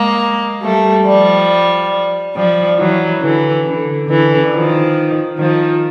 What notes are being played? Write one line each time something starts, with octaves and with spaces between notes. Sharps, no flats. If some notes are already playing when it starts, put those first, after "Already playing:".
Already playing: G#3 A#3
G3 A3
F3 G3
F3 G3
E3 F#3
D3 E3
D3
D3 E3
D#3 F3
D#3 F3